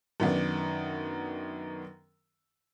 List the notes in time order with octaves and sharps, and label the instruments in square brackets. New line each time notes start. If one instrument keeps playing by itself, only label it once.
[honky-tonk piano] F#2 D#3 B3 D4